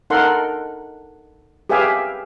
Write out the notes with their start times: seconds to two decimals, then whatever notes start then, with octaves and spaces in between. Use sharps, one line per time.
0.10 D#4 A4 A#4 F#5 C6
1.69 G4 G#4 B4 E5 F5 G#5